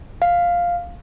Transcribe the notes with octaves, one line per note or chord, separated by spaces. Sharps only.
F5